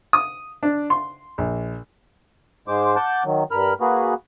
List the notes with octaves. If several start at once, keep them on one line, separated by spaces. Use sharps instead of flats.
D#6
D4
C6
A#1
G#2 G#3 C5 D6
F#5 A5 D6 G6
D#3 F#3
G2 A#4 B5 F6
A#3 F#4 G#4 B4